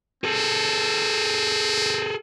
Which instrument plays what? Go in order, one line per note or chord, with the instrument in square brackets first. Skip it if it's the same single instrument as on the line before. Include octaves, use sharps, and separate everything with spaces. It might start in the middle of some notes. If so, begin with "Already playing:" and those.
[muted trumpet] C4 [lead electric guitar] G#4 A4